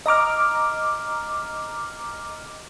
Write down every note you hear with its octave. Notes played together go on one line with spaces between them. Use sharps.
D#5 A#5 D6 F6